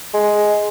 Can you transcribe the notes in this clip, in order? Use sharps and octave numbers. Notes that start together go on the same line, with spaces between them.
G#3